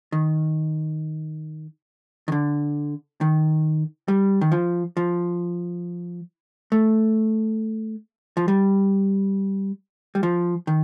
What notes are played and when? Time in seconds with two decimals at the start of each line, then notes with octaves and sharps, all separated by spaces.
0.12 D#3
2.28 D#3
2.32 D3
3.21 D#3
4.08 G3
4.41 D#3
4.52 F3
4.97 F3
6.72 A3
8.37 F3
8.48 G3
10.15 G3
10.23 F3
10.67 D#3